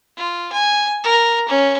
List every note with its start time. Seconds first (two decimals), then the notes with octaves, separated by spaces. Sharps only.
0.17 F4
0.52 G#5
1.04 A#4
1.48 C#4